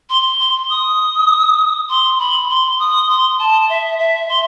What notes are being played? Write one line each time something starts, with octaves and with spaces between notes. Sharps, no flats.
C6
C6
D#6
C6
B5
C6
D#6
C6
A5
E5
E5
C6